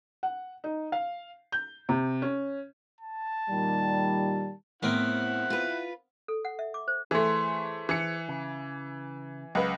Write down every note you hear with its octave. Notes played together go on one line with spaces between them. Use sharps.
F#5
D#4
F5
G6
C3
C#4
A5
A#2 D#3 G3
A2 B3 C4 E4 A#4 F#5
F4 B4
A4
F#5
E5
D6
C5
E3 A3 G#4 C5
E3 C#7
C#3
C#2 F#3 B4 F5 F#5